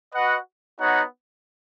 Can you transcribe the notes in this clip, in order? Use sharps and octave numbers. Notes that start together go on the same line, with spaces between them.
F#4 B4 D#5 F#5
B3 D#4 F#4 C#5 F#5